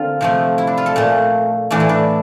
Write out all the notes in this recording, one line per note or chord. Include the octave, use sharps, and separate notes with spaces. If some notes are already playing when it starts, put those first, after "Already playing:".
Already playing: D3 A#3 C4 F4
C3 F3 A3
E4
D4
F4
A4
A#2 A3
A2 E3 A3 D4
E4
D4